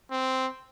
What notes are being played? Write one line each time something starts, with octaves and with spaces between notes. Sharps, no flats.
C4